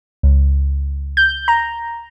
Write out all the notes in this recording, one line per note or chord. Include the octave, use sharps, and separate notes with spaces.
C#2
G6
A#5